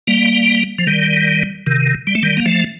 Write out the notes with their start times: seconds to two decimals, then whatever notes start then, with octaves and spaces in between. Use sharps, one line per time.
0.07 G3 A#3
0.79 F3
0.87 D#3 G3
1.67 C3 D#3
2.07 G3
2.15 A3
2.23 D#3 G3
2.37 A#3
2.46 F3 A3